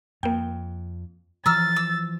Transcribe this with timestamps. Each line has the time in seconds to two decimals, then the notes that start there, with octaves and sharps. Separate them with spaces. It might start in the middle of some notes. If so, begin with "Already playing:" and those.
0.23 F2 A#3 G5
1.46 E3 F3 A#5 E6 F6 A6
1.76 E6